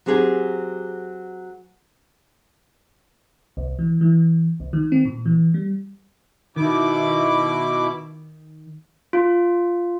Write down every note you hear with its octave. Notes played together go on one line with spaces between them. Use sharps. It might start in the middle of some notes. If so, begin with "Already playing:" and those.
F#3 C4 G4 G#4
C2
E3
E3
C2
D#3
C4
A#2
E3
G3
B2 D#3 E4 D6
F4